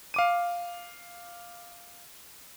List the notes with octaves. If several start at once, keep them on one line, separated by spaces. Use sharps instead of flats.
F5 D6 D#7